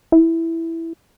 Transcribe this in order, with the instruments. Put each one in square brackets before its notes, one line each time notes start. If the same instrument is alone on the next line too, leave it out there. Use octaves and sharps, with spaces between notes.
[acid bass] E4